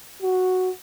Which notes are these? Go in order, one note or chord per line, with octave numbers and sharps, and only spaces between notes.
F#4